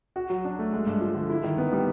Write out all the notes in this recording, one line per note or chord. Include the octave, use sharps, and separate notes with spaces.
F#4
F#3
D4
A3
G#3
G2
F3
D3
E4
D#3
B3
G3